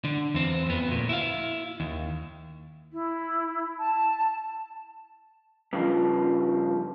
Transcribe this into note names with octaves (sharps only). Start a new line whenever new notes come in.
D3
E2 C4
F2 B3
D2 A#2
E4 F5
D#2
E4
A5
G2 C#3 F3